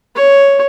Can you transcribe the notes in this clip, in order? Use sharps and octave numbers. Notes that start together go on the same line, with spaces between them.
C#5